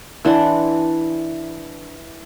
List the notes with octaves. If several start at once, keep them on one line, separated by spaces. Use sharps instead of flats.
E3 D4 F#5 C6